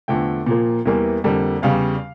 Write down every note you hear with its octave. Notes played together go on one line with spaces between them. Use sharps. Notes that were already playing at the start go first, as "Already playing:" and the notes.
E2 D3 F3 A3 G5
A#2 F3 A#3
E2 E3 G3 A#3
F2 D3 G3 A#3
E2 C#3 G3 F5